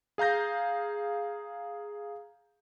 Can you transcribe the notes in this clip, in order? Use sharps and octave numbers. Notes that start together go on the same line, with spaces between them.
G#4 F5 A#5 G6 A#6